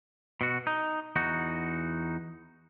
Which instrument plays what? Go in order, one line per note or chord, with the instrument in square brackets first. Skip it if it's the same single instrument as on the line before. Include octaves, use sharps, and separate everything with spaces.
[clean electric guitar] B2 F#4
D#4
E2 D#4 F#4